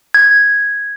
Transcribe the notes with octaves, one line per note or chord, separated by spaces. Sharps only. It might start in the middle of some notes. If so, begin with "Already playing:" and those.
G#6